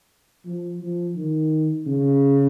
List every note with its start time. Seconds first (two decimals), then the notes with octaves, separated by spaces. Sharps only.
0.46 F3
0.81 F3
1.16 D#3
1.87 C#3